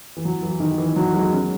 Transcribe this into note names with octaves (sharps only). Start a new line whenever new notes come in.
E3
F#3
E3
D#3
E3
E3
F#3
G#3
C#4